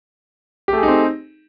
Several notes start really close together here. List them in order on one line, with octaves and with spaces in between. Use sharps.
G4 A3 G#4 D#4 C4